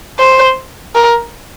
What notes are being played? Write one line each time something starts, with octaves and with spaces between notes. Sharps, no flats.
C5
A#4